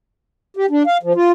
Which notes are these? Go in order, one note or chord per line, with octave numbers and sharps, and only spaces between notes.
G4
D4
F5
F3
F4